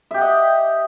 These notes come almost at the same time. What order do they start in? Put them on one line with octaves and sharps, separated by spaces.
E5 G4 F#5 D#5